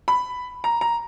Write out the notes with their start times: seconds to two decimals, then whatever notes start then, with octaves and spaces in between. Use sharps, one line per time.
0.08 B5
0.64 A#5
0.81 A#5